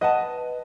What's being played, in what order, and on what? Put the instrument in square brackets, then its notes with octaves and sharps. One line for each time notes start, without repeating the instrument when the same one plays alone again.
[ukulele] B4 F#5 A5 [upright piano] D#5